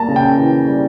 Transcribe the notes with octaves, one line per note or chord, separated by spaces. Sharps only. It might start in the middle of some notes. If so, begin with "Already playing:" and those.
Already playing: G3 A#3 A5 A#5
C#3
G5
E3
G3